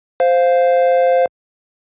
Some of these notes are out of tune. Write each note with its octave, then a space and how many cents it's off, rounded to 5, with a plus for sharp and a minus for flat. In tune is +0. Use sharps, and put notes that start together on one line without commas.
C5 -5 F5 +0